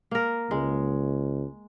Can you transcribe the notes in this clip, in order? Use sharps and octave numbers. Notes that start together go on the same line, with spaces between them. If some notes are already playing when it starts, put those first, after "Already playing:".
A#3 A#4
C#2 G#3